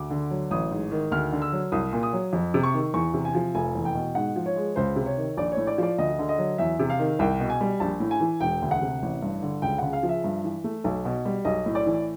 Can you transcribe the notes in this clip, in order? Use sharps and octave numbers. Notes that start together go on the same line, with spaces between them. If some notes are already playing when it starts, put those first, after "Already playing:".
Already playing: D2 D6
D3
F#3
A1 D#6
G#2
D#3
D2 F6
D3
E6
F#3
C2 D#6
A#2
D#6
F#3
F2
C3
C#6
D#3
E2 C#6
C3
G#5
F3
F1 G#5
E2
G5
B2
G#2 F#5
F3
C#5
G#3
C#2 C5
C3
C#5
D#3
A#1 D5
A2 C#5
D5
F3 D5
D2 D#5
D3
D#5
F#3
E2 E5
C3
F5
D#3
C2 G5
B2
G#5
G3
A#1 A5
A2
G#5
E3
E1 G5
D2
F#5
C3
A1
G2
D3
C#2 G5
C#3 F#5
F5
F3
E5
G2
E3
A3
B1
B2
G3
B1 D#5
A2
D5
E3